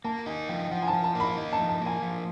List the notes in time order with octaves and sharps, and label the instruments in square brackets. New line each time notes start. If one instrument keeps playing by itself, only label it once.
[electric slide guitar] A#3 [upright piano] A5
[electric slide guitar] D#4 [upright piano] G#5
[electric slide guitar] F3 [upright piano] G5
[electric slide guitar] F3 [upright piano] F#5
[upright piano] G#5
A5
[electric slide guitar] F3
[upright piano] A5
[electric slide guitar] A#3 [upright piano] B5
[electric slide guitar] D#4
[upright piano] A5
[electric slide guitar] F3
[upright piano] A5
[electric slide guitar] A#3
[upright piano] G#5
[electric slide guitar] F3